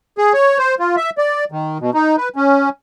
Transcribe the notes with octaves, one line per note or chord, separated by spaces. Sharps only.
G#4
C#5
C5
F4
E5
D5
D#3
B2
D#4
B4
C#4